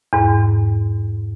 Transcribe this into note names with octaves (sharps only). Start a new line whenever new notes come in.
E2 G#2